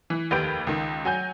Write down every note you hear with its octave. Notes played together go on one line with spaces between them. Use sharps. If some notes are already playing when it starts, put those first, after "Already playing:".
E3
F1 D#2 G4 B4 G6 D7
C#2 D#3
F#3 G#5 G6